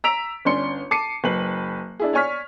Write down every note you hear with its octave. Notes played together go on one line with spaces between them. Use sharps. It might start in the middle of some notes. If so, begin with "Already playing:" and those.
A#5 E6 B6 D7 F7
G1 C#4 D5 C6 C#7
A5 D6 C7 C#7 D#7
F#1 B4 F#7
D4 E4 G#4
C#5 D5 G#5 C#6 F6 B6